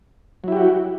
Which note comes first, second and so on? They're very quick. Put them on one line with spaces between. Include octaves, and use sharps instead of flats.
F#3 E4 G4 F#4